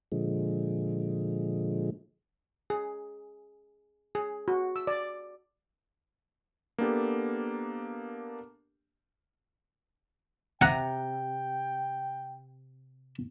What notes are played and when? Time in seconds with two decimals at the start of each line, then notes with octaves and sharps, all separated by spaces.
0.12 A#2 D3 F3 G#3
2.70 G#4
4.15 G#4
4.48 F#4
4.76 E6
4.87 D5
6.78 A#3 B3 D4 G4 A4
10.61 C3 F#5 G5 A#5